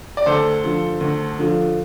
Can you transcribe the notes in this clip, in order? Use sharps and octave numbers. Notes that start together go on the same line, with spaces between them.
D5
D2 A4 C5
D3 F3
D2
D3 F3